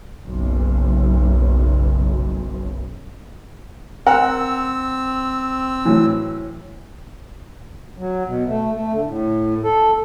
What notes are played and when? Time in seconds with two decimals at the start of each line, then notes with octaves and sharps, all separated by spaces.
0.25 F#1 B1
4.06 C4 A#4 F#5 A#5 E6
5.85 A2 E3 F#3
7.98 F#3
8.26 B2
8.46 A3
8.72 A3
8.93 D3
9.06 A2
9.63 A4